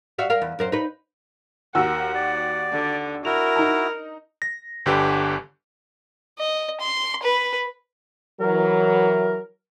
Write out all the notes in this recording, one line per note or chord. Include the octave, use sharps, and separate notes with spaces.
F#4 E5 F5
A#4 F5
E2
F#2 A#4 C5
D#4 B4
D#2 F#4 A#4 F#5 E6
D5
D3
E4 F#4 A#4 F7
D#4 A#5
A#6
G1 D3 G4 B4
D#5
C6
B4
E3 F#3 A#4